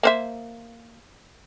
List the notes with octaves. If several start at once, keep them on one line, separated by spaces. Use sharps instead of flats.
A#3 C5 E5